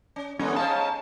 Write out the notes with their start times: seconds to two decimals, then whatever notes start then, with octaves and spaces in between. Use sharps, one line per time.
0.16 C#4
0.39 D3 E3 G3 A#3 B3 C#4 D4
0.56 G#3 C#4 D#4 C5 F5 A5